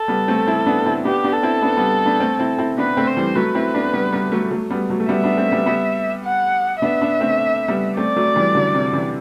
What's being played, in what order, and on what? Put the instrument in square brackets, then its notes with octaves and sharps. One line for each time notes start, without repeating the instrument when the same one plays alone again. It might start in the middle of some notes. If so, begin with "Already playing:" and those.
Already playing: [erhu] A4
[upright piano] G3 B3
A3 C4
C4 E4
B3 D4
C4 E4
[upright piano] B3 D4 [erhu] G4
[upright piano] B3 D4
[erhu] A4
[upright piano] C4 E4
B3 D4
G3 B3
B3 D4
A3 C4
C4 E4
C4 E4
[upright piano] B3 D4 [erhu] B4
[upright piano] A3 C4
[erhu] C5
[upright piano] E3 G3
[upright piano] F#3 A3 [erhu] B4
[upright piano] C4 E4
B3 D4
G3 B3
G3 B3
F#3 A3
F#3 A3
G3 B3
F#3 A3
A3
[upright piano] G3 B3 [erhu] E5
[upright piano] B3 D4
A3 C4
G3 B3
G3 B3
[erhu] F#5
[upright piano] B3 D4 [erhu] E5
[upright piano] B3 D4
A3 C4
G3 B3
[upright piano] A3 C4 [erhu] D5
[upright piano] F#3 A3
E3 G3
D3 F#3
C3
C3 E3